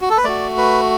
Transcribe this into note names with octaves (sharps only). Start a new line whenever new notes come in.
F#4
A4
B4
A3 F#4 D5
B4